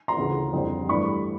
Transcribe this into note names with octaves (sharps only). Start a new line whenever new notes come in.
A#5 C6
D2 C#3 E3
F2 D3 G3 C4
G2 E3 A3 D4 B5 C#6